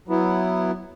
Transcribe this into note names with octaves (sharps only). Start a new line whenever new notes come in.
F#3 B3 E4